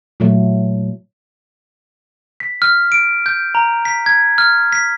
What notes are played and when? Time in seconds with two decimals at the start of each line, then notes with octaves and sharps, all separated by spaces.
0.20 A#2 E3 F#3 A3
2.40 B6
2.62 F6
2.92 D7
3.26 G6
3.55 A#5
3.85 B6
4.06 G#6
4.38 F6
4.72 B6